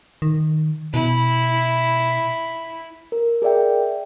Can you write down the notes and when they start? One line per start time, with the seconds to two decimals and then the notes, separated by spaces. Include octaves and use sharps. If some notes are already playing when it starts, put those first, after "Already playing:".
0.22 D#3
0.94 B2 E4
3.12 A#4
3.42 G#4 A#4 D5 E5 G5